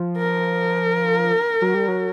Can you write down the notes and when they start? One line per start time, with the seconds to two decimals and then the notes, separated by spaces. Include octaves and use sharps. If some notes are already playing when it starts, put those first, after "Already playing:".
Already playing: F3
0.18 A#4
1.62 F#3
1.74 G3
1.88 F#3